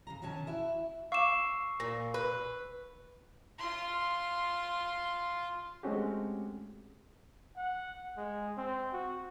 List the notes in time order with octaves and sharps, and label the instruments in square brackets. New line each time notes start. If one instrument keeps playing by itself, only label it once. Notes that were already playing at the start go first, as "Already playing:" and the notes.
[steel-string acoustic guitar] C#3 A3 A#5
B2 D3 D#3 C#4 G#5 A5
E4 F#4 E5
[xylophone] F5 D6 E7 [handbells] C#6 E6 C7
[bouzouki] A#2 [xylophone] A#6
[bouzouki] B4
[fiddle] F4 C6
[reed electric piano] G#3 A3 C4 C#4 F#4 G4
[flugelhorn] F#5
G#3
C4
F#4